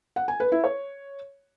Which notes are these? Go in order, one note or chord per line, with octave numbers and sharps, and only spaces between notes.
F#5
G#5
B4
E4
C#5